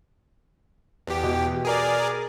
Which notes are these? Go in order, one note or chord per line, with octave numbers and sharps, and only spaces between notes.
E2 G4
B2
G#4 A#4 D5